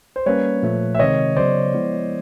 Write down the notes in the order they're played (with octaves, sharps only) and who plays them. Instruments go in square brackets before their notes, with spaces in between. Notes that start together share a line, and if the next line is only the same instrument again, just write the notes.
[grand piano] C5
[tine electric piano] G3 A#3 C#4 [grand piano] B4 C#5
[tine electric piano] A#2 F3 A3
[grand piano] E5
[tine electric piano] C3 D#3 G#3 C4 [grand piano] C#5 D#5
[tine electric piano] C#3 F#3 B3 [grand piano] C5 D5
[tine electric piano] F3 G#3 B3 E4